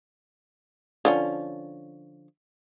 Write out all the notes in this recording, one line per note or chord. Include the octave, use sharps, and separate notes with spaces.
D3 F3 C#4